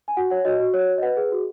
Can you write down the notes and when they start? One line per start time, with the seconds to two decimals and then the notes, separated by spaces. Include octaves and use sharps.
0.08 G#5
0.17 F#4 F#5
0.30 C#5 F#5
0.45 F#4 D#5
0.60 F#4
0.74 C#5
0.88 F#4
0.98 D#5
1.02 B4 F#5
1.17 G#4
1.32 F#4